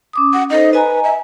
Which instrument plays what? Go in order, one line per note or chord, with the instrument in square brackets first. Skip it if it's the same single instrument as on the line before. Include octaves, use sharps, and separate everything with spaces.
[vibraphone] C#4 D6 D#6
[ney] F#5
[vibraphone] D#4 A4 C5 [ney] D#5
[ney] B4 [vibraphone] D#5 G#5 A#5
[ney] E5